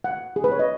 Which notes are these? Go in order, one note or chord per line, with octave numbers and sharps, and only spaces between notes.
F#5
G#4
B4
C#5
D#5